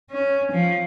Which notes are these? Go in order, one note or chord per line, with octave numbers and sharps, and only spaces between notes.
C#4
F3